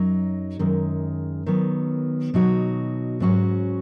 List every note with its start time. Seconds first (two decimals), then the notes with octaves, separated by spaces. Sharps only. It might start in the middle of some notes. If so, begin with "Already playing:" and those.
Already playing: F#2 F#3 D#4
0.59 F#2 D#3 G#3
1.46 D#3 F#3 B3
2.34 B2 F#3 D#4 F#4
3.20 G#2 F#3 C#4 F#4